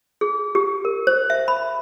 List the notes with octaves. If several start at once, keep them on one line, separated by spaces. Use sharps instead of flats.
G#4
G4
A#4
C5
E5
B5